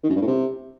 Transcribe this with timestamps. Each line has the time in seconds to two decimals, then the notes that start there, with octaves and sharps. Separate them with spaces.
0.03 D#3
0.09 F#2
0.15 G2
0.21 A2
0.27 C3